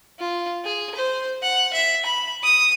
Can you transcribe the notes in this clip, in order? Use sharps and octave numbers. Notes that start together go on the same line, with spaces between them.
F4
G#4
C5
F#5
E5
B5
D#6